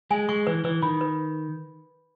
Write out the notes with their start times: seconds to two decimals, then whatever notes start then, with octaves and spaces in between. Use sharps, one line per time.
0.11 G#3 G#5
0.29 G#3 C#6
0.47 E3 B4
0.64 E3 B4
0.82 D#3 B5
1.01 B4